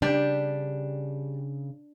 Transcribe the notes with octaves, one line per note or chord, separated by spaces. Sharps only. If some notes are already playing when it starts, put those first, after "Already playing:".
C#3 G3 D4 G4 D5